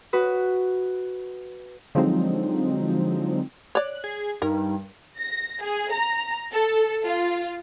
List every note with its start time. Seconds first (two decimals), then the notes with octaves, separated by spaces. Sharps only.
0.13 F#4 B4 D#6
1.95 D3 F3 F#3 G#3 C4 D#4
3.75 C#5 D5 F#6
4.04 G#4
4.42 G2 D#4 A#4
5.18 A#6
5.60 G#4
5.92 A#5
6.51 A4
7.05 F4